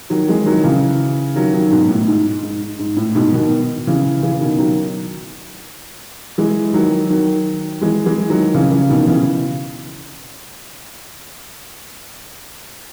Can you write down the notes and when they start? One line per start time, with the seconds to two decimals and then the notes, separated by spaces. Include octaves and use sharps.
0.10 D#3 F#3
0.28 E3 G#3
0.46 D#3 F#3
0.63 C#3 E3
1.36 D#3 F#3
1.53 D#3 F#3
1.71 G#2 B2
1.89 A2
2.08 G#2
2.43 G#2
2.79 G#2
2.97 A2
3.15 G#2 B2
3.33 B2 D#3
3.87 C#3 E3
4.23 C#3 E3
4.41 B2 D#3
4.59 D#3 F#3
6.38 E3 G#3
6.74 D#3 F#3
7.10 D#3 F#3
7.81 E3 G#3
8.06 E3 G#3
8.30 D#3 F#3
8.54 C#3 E3
8.71 C#3 E3
8.89 B2 D#3
9.07 C#3 E3